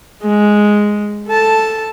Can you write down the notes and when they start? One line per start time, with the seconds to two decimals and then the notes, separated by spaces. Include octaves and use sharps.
0.23 G#3
1.28 A4 A5